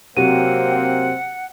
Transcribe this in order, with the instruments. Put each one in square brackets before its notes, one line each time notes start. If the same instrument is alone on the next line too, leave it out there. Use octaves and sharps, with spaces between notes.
[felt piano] C3 F#3 [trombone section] A#3 C4 [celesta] G4 D#7 [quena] F#5